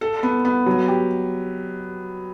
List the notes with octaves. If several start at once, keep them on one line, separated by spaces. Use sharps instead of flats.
A4
B3
B3
F#3
G4